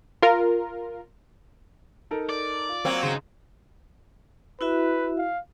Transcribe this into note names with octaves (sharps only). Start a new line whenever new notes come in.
F4 A#4
D#4 A4 A#4
D5
F4
F#3 A#3 C4
C#3 D#4 C5
E4 F#4 B4 E5
F5